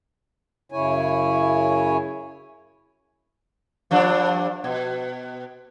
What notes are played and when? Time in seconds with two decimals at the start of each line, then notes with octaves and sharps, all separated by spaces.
0.72 F#2 C#3 E4 C#5 G#5
3.91 G2 F3 D4
4.64 B2